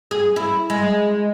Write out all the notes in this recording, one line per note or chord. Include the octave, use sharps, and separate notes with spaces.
G#4
E4
G#3